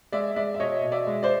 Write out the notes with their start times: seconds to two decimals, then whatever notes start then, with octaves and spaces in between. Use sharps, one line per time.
0.12 G#3 D5 E5
0.36 G#3 D5 E5
0.54 E5
0.60 B2 C#5 D#5
0.84 B2
0.92 D5 E5
1.07 G#3
1.23 C5 D5